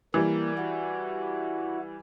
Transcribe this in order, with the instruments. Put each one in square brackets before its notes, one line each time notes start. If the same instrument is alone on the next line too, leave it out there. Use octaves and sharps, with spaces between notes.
[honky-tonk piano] E3 G3 [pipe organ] A#3
[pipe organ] E4 F#4